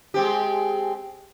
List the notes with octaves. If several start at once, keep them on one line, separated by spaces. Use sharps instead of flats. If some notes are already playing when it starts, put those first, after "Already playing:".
G#3 C4 G4